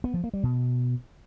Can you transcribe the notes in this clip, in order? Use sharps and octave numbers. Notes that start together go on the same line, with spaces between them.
B3
F3
A#3
G3
B2